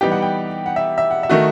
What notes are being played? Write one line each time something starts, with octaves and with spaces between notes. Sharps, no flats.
E3 G3 B3 D#4 G4 G5
F#5
G5
F#5
E5
E5
F#5
E5
D#3 A3 D#4 F#4